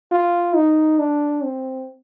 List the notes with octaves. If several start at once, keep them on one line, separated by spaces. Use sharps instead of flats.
F4
D#4
D4
C4